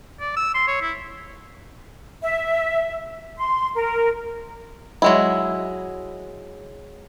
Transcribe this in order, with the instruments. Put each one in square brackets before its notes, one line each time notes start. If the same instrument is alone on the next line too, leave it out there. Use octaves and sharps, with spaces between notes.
[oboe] D5
E6
C6
C#5
E4
[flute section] E5
C6
A#4
[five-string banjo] F#3 G#3 E4